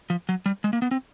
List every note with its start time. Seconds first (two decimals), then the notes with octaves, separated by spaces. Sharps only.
0.10 F3
0.29 F#3
0.46 G3
0.64 G#3
0.73 A#3
0.82 B3
0.91 C4